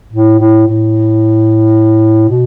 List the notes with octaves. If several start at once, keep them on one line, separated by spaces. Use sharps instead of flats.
A2
A2
A2
B2